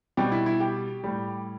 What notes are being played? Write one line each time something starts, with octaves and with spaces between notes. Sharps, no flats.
B2 G3 G4
E4
E4
G4
A2 G3